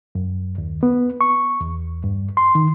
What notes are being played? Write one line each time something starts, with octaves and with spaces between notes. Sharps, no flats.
F#2
D#2
B3
C#6
E2
G2
C6
D#3